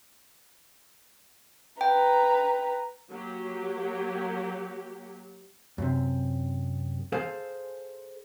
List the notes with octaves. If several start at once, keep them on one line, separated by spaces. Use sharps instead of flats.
B4 G5 A#5
F#3 A#3 G4
F#2 C3
G#4 A4 C5 F5